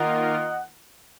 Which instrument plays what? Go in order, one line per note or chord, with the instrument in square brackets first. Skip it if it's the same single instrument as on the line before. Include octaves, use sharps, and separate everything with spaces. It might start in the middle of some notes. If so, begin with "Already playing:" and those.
Already playing: [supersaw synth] D#3 A#3 F4 A#4 [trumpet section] D#5 F#5